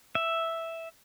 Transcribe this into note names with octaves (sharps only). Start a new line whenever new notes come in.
E5